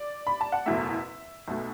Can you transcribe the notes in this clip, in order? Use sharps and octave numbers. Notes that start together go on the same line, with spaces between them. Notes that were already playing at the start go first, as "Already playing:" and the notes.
Already playing: D5
B5
A5
F#5
F#1 E2 B2 A3 E5
B1 B2 A3